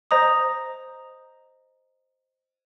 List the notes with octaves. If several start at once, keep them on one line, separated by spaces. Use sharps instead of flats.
C5 D#5 A#5 D#6